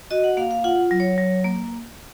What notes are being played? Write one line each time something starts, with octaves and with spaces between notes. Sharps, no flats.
F#4 D#5
F#5
A#3 F5
F5
F4 F#5
F#3
C#5
F#3
A#3